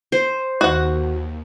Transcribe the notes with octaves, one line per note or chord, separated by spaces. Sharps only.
C5
D#2 F#4 F#5